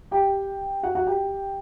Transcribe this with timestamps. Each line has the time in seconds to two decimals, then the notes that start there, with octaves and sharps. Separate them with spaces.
0.11 G4 G5
0.83 F#4 F#5
0.95 F#4 F#5
1.07 G4 G5